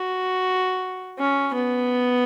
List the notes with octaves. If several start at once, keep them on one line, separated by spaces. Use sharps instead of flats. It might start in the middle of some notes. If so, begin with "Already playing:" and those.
Already playing: F#4
C#4
B3